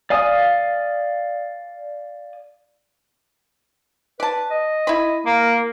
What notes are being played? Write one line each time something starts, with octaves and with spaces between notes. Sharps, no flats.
D5 F5 G#5 D#6
B4 D5 A5
D#5
E4 B5
A#3 A#4